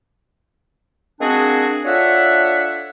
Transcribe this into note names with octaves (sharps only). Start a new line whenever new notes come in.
G#3 A#3 C4 D4 F#4 G#4
D4 F4 A4 C#5 E5 F#5